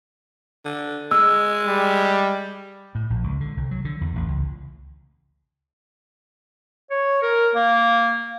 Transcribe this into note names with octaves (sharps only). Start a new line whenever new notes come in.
D3
G#3 E6
G3
A2
A#1
C#2
D3
C2
F#3
D3
E2
A1
C#2
C#5
A#4
A#3